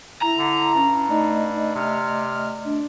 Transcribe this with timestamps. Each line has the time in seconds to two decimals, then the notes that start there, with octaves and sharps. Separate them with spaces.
0.22 E4 A#5
0.38 D3
0.75 G2 C#4
1.09 A3 D#4 D5 D#5
1.75 C3 F6
2.65 D4